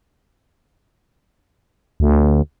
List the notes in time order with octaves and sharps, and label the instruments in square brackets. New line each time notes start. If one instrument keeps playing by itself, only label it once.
[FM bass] D2